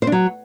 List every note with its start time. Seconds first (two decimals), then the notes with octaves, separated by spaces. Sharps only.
0.02 C5
0.07 D4
0.12 F#3